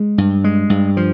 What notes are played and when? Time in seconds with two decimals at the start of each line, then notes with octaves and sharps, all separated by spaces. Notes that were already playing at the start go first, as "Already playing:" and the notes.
Already playing: G#3
0.18 G2
0.44 G#3
0.70 G2
0.97 F3